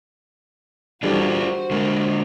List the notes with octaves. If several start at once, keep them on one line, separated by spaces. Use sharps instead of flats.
D3 E3 G3 D4 F4 F#4 G#4 C5
D3 G#3 A#4